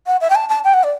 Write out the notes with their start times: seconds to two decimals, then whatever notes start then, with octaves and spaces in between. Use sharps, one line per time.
0.07 F#5
0.21 E5
0.30 G5
0.35 A5
0.49 A5
0.64 G5
0.74 F#5
0.84 D5